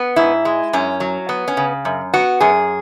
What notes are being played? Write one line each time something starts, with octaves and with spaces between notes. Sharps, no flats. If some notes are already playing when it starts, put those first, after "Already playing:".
Already playing: B3
G#2 E4
G#3
F#2 C#4
F#3
B3
C#4
C#3
F#2
B3 F#4
F#2 G#4